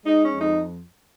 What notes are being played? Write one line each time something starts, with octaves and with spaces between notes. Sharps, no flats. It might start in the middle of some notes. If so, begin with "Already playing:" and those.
G#3 D#4
C#4
F2
D#4